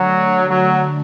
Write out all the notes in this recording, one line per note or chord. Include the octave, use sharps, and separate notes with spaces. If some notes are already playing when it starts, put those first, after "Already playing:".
Already playing: D3 F#3 A3 D4
F#3